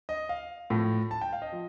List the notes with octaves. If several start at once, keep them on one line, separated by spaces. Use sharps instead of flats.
D#5
F5
A2 F3
A5
G5
F5
D#5
F3